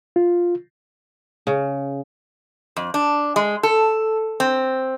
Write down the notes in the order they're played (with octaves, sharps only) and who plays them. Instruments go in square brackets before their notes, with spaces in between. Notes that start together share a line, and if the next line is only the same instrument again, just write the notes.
[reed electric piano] F4
[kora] C#3
[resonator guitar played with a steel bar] F2
D4
G#3
A4
C4